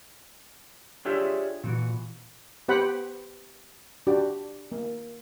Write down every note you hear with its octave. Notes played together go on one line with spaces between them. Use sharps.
D4 F4 G4 G#4 C#5 E5
A#2 E3 F#4
B3 G4 C5 F#5 G5 B5
D4 F#4 G4 D5
A#3